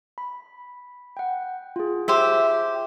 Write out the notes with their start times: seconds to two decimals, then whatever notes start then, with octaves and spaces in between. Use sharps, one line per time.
0.18 B5
1.17 F#5 G5
1.76 F4 G#4
2.08 G4 C5 E5